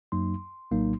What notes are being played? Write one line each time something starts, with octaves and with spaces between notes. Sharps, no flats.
F#2 F#3 A#3 D#4 C6
A#1 A2 F#3 A#3 D#4